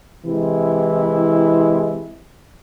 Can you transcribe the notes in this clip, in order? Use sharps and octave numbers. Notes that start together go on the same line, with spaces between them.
C3 E3 G#3 E4